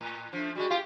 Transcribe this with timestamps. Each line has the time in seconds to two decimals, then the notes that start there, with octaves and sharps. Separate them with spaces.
0.01 A2
0.33 F3 A3 D4
0.55 G3 G#3 F#4
0.71 F4 G4